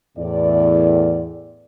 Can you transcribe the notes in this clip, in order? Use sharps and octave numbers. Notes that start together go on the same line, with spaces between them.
E2 A2 D5